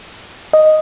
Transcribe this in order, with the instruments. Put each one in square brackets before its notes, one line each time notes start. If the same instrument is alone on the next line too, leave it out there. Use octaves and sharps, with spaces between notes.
[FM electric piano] D#5